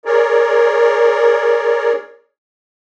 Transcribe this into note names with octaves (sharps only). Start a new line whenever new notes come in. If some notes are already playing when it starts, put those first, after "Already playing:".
G#4 A#4 C#5 D5